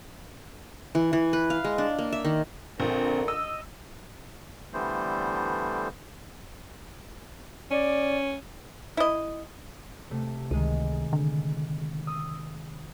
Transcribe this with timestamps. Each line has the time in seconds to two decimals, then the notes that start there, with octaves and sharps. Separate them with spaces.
0.95 E3
1.13 E3
1.33 B4
1.50 F5
1.64 G#3
1.78 D4
1.99 A#3
2.12 E5
2.25 D#3
2.80 A#1 D3 C4 A#4
3.28 D#5 E6
4.74 D3 E3 G3 A3 B3 C5
7.71 C#4 D5
8.97 E4 D#5
10.11 C3 A3
10.51 C#2 D#3 G#3 D#7
11.13 D3
12.07 D#6 E6